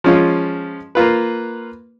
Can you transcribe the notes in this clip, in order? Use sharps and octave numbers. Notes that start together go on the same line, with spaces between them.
F3 G#3 C#4 F4
A#3 F4 B4